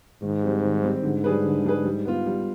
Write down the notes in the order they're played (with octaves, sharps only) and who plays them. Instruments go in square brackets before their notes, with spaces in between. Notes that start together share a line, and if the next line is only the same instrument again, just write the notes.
[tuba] G#2 [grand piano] D#3
[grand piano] G3 C4 G4
D#3
G3 C4 G4
[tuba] G#2 [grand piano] D3
[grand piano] G3 D4 G#4 B4
D3
G3 D4 G#4 B4
G3
B3 F4
G3